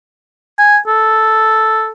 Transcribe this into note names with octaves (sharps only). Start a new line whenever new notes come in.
G#5
A4